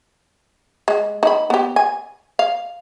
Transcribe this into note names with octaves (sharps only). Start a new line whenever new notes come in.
G#3
D#4 B5
B3 G4
G#5
F5